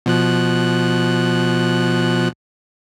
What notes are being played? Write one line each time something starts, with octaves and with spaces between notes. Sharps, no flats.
B2 F3 F#6